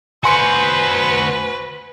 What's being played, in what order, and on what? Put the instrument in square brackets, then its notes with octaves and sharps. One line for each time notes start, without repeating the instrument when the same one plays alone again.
[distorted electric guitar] F#4 C5 [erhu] B4 [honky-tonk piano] G#5 C6 C#7